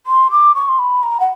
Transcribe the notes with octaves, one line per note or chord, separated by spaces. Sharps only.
C6
D6
C#6
C6
B5
A#5
F#5